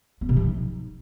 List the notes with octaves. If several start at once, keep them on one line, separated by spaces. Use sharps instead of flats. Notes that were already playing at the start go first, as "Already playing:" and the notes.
B3
C3
F3
D#4